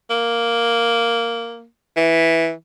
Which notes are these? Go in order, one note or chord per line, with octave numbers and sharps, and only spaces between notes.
A#3
E3